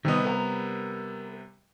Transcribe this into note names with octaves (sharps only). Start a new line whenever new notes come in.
C3 D#3 G3 B3 D#5
A#4 G5 A#5